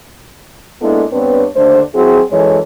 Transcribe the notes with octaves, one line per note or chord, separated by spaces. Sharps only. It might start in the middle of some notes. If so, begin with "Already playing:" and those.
G#3 A#3 B3 D4 E4 A4
G2 B3 C4 D4 B4 C#5
D#2 D3 A3 D4 C5
F#3 C4 E4 F#4 G#4
F#2 E3 G#3 A4 C#5